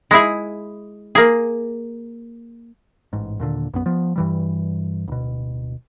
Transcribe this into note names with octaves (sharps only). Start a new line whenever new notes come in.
G#3 E4 G#4
A#3 G#4
A1 G#2
D#2 A#2 D3
B1 F#2 B3
F3 B3
G2 E3 G3
D1 B2